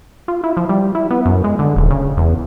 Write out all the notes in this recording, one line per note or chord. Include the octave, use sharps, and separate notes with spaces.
F4
E4
F3
G3
E4
B3
F#2
G#3
D3
D#1
C#3
E2